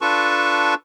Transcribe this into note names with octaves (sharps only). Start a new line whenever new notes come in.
D4 F4 A4 B4 A5 C#6